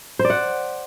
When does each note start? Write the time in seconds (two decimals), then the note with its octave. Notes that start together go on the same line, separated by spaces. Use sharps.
0.19 C5
0.25 D5
0.30 F#5